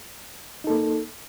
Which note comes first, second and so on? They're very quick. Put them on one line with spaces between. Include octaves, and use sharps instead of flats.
D#4 A4 A#3